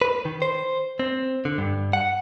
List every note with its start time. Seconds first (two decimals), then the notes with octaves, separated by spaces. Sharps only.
0.02 B4
0.25 D#3
0.42 C5
0.99 C4
1.45 D3
1.58 G2
1.93 F#5